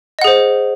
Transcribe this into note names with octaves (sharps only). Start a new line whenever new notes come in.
G#4 C5 D#5 F#5